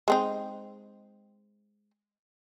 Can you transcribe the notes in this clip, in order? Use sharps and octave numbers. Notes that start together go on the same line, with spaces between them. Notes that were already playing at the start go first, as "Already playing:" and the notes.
G#3 C4 D#4